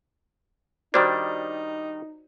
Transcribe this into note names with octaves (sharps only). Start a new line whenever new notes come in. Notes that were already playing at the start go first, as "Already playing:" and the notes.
D#3 G3 D4 D#4 F#4 C5 D5